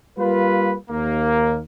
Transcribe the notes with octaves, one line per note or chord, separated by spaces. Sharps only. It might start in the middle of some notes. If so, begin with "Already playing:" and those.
G3 A#3 F4 B4
D#2 A#3